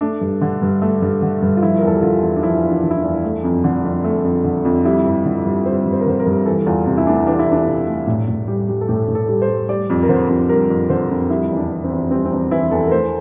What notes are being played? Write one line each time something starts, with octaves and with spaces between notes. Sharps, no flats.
A3 D4
G2
D3
G2
A3
G2
D3
G2
F4
F3 E4
A#4
E2 A4
G4
D3 F4
E2
D4
F3 E4
E2
D4
D3
E4
D4
E2
A3
F2
D3
F2
A3
F2
D3
F2
G3 E4
G2
D3
G2
G3 C5
G2
C5
A#4
D3 C5
A#4
G2
E3 A4
E2 F4
C3
E4
A3 D4
E3 D4
E4
E2 D4
C3
A3
A2
A2
G3
G3
A4
A2 G4
A2
A4
G3
C5
G3
G3 D5
F2
A#4
D3 C5
F2
G3 A#4
F2
D3 C5
F2
G3 E4
E2
D4
E3
C4
E2
G3 C4
C4
E2 D4
E3 E4
E2 A4
A#4
A3 C5